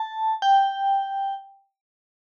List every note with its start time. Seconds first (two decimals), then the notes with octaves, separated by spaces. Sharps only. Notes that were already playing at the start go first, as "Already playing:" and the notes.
Already playing: A5
0.42 G5